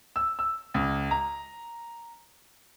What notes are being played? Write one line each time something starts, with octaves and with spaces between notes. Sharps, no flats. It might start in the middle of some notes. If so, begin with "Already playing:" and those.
E6
E6
C#2
A#5